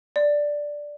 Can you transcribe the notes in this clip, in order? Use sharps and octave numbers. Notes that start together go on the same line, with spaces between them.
D5